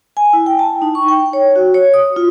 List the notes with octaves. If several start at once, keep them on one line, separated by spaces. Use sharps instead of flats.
G#5
E4
G5
A5
D#4
C#6
G5
C#5
F#4
C#5
D#6
F4